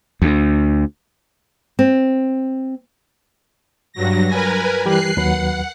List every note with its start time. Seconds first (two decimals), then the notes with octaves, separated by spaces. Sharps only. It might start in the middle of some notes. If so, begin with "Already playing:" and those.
0.22 D2
1.79 C4
3.93 G2 F#3 A#6
4.28 A#4 B4 G#5
4.86 E3 G3 G4 F#6 C7
5.17 D#2 F#3 B4 F#5